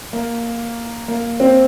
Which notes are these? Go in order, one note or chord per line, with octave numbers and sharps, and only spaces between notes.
A#3
A#3
C4